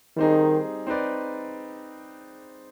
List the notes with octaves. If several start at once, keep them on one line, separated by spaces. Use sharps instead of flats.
D#3 G3 C4 D#4 G#4
C4 D#4 B4 D5